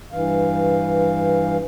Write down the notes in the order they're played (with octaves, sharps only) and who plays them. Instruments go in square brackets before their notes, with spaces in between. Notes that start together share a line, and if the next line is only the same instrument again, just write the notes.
[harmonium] G2 E3 F5